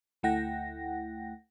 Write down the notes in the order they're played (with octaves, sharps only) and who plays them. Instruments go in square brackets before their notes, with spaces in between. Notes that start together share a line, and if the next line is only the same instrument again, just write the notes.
[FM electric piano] D2 A3 E4 F#5 G5 A#6